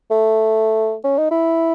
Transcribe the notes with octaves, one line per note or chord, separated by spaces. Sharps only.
A3
C#4
D#4
E4